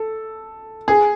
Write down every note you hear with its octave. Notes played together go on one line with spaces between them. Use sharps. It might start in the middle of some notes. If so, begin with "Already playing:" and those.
Already playing: A4
G#4